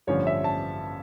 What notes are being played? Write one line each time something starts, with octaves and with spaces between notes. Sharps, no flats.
A1 G2 D3 F3 C#4 C#5
E5
A5